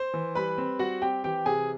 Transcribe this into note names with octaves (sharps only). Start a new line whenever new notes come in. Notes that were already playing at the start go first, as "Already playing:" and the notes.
Already playing: C5 C6
E3
G3 B4 B5
C4
G3 F#4 F#5
C4 G4 G5
E3 G4 G5
C3 G#4 G#5